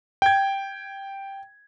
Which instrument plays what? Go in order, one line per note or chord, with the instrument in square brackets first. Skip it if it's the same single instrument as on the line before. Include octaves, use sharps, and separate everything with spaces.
[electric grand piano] G5 G#6